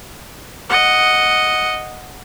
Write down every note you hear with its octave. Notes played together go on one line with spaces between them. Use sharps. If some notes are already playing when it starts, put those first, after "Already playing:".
D#5 F#5